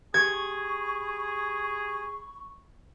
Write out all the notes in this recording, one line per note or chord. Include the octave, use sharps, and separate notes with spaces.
G4 G#4 B5 C#6 G#6